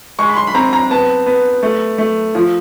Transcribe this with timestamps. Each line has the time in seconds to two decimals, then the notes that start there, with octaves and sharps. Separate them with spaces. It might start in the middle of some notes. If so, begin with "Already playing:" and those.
0.19 G#3 C#6
0.28 B5
0.36 C6
0.47 B5
0.54 C4 A#5
0.73 A#5
0.91 B3 A5
1.26 B3
1.63 A3
1.98 A3
2.35 F3